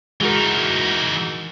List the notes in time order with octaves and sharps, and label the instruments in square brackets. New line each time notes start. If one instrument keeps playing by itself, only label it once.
[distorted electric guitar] E3 D#4 [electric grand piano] G#3 F#4 A#4